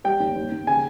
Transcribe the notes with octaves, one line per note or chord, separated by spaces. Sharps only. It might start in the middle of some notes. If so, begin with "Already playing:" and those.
G3 G5
D#2
D#2
D#2
C#3 G#5